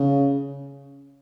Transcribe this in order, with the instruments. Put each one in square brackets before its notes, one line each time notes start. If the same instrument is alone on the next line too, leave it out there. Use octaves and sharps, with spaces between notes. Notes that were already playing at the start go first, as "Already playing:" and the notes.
Already playing: [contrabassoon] C#3